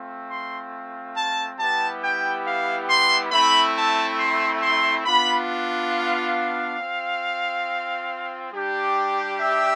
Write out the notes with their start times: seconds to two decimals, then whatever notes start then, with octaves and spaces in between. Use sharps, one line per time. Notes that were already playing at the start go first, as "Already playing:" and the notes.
Already playing: A3 C4 F4
0.28 C6
1.15 A5
1.58 G3 B3 E4 G4 A5
2.02 G5
2.45 F5
2.88 C6
3.32 A3 C4 E4 B5
3.76 A5
4.19 C6
4.62 C6
5.05 B3 D4 F4 B5
5.92 F5
6.79 C4 F4
8.53 G3 D4 G4
9.39 E5